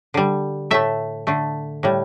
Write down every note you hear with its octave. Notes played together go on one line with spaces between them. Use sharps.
D3 G3
A2 A3 E5
D3 A3
A2 G3